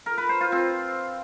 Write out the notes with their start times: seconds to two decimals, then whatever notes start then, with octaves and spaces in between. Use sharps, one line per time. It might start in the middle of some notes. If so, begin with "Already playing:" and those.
0.06 A#4
0.18 B4
0.29 C5
0.41 F4
0.52 C4